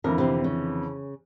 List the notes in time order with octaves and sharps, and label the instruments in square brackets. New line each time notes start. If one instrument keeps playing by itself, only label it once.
[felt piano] F2 D3 E3 [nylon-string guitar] A#4
[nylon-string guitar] C3 C4
C#3